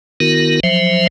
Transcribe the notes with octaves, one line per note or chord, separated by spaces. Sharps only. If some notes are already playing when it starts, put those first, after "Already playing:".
D#3 B3 E4 F#4 A#4
F3 F#3 C5 E5